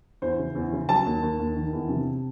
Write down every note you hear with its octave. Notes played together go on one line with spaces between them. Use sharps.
E2 C5
C#3
E2
C#3
F#3 A5
D#2
D#2
D#2
D#3
E2
C3